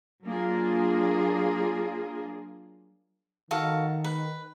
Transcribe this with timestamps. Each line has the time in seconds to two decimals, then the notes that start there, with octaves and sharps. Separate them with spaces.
0.25 F#3 A#3 D4 F4 G#4
3.51 D#3 F#4 A4 F5
4.04 B4